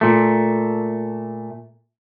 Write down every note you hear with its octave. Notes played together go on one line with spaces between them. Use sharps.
A#2 A3